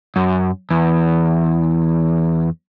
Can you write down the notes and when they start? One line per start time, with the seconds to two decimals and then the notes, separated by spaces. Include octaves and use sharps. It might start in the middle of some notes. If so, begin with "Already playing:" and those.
0.16 F#2
0.71 E2